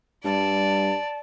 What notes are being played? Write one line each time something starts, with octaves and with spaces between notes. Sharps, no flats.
G2 G3 D5 A5